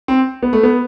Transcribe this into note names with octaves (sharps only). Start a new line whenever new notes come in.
C4
B3
A3
B3